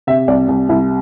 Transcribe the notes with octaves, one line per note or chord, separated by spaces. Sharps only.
C3 E5
C2 D5
C2
C2 E4